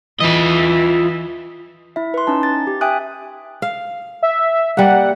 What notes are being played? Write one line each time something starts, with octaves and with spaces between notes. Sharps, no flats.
E3 F4 D#5
E4 E5
B4 C6
C#4 D#4 A5
A6
G4
E5 G5 G#5 D#6 F#6
F5
E5
G3 A#3 F#5